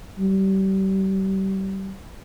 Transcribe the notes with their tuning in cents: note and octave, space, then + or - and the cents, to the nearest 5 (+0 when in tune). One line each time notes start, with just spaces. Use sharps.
G3 -30